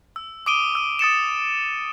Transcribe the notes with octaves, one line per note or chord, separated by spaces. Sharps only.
E6
D6 D#6 D7 D#7 G7
D6 E6 D#7
D#6 A6 C#7 E7